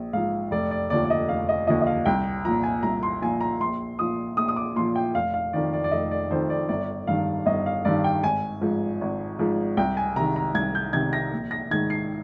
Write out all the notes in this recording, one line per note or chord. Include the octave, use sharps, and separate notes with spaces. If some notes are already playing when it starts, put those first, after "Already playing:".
Already playing: A#1
G#2 F3 F5
F1 D5
D5
D#2 D3 F3 D5
D5
D#5
F1 F5
D#5
D#2 D3 F3 D#5
D#5
F5
C2 G5
A#2 F3 A#5
G#5
C2 A#5
C6
A#2 F3 G#5
A#5
A#1 C6
A#2 F3 D#6
A#1 D#6
D#6
D6
A#2 F3 C6
G5
F1 F5
F5
F2 D#3 D5
D5
D5
F1 D#5
D5
F2 D#3 C5
D5
G1 D5
G2 D#3 F5
G1 D#5
F5
G2 D#3 D5
G5
G#1 G#5
G#2 F3
G#1
G#2 F3
C2 G5
G#5
C3 D#3 A#5
A#5
C2 G#6
G6
C3 D#3 G#6
A#6
A#1
A#6
G#2 D#3 G#6
C7